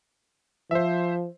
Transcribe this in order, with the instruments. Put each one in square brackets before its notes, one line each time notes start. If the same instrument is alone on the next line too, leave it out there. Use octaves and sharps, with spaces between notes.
[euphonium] F3 [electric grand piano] C5 E5